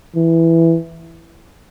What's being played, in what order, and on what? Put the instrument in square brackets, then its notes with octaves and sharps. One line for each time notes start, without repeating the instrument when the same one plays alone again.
[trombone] E3